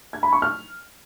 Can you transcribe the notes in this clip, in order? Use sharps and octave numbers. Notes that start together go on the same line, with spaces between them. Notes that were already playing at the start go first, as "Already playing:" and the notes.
G#6
B5
C#6
F6